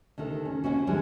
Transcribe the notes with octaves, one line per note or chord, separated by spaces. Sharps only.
D2 C3 D#3 A4
C#4
D#2 C4 C#4 F#4
F#2 D3 E3 F3 G3 G#3